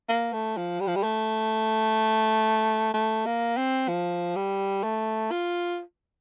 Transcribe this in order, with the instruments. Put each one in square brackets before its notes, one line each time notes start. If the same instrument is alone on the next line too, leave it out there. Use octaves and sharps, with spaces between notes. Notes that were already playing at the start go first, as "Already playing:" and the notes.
[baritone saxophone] A#3
A3
F3
G3
F3
G3
A3
A3
A#3
C4
F3
G3
A3
F4